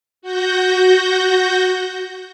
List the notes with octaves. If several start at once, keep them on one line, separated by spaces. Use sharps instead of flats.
F#4 G6 A#6